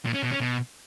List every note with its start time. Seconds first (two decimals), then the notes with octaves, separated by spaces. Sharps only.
0.05 A#2
0.14 C#4
0.23 B2
0.32 C#4
0.40 B2